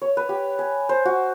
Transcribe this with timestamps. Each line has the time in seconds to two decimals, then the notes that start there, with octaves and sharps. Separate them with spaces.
0.02 C#5
0.17 B4
0.29 G4
0.59 G#5
0.89 C5
1.05 F#4